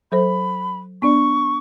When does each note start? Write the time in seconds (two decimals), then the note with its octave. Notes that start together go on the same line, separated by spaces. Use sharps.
0.12 F#3 A4 C5 B5
1.02 B3 D4 D5 C#6